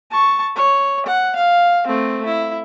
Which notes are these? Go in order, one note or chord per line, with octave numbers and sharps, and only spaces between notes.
A5 C#6
C#5
F#5
F5
A3 C4
E4